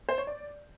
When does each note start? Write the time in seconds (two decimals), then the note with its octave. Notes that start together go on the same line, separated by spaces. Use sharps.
0.09 C5
0.18 C#5
0.27 D5